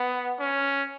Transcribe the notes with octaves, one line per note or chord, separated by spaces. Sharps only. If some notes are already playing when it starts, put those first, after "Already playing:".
Already playing: B3
C#4